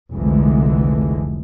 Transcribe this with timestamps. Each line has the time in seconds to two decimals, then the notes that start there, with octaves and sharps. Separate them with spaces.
0.12 F1 C2 D3 E3 G#3